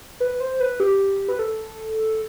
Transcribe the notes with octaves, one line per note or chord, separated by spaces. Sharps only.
B4
C5
B4
G4
B4
A4